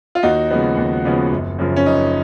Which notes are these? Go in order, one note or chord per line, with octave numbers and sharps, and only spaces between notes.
F4
D#2 D#4 F#4
C#3 F3 G#3 B3
D#2
C#3 F3 G#3 B3
F#1
F#2 C#3 F3
C#4
F#1 D#4